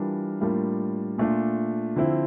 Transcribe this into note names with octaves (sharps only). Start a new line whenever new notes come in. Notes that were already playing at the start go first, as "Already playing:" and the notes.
Already playing: E3 G3 D4 F4 A#4
A2 G3 A#3 D4 F4
A#2 A3 D4 F4
D3 F3 C4 E4